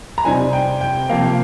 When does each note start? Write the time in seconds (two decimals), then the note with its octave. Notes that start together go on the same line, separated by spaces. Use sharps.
0.18 A#5
0.25 C3 G3 C4 D#4 G#5
0.53 G5
0.81 G5
1.09 C3 F3 A#3 F5